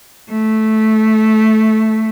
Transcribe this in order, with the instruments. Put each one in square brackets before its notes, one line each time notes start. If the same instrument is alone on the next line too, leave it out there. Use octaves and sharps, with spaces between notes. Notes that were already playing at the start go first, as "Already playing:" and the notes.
[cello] A3